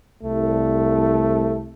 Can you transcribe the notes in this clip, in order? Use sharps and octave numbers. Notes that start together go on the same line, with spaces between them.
C2 A3